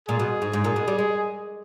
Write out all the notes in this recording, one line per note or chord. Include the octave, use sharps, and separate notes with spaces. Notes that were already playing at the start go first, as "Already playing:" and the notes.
A#2 G#4
B2
G#2
G#2
A#2
B2
G3
G#3